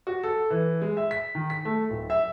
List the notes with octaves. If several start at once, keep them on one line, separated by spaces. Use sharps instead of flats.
F#4
A4
E3
G#3
E5
B6
D#3
B6
A3
D1
E5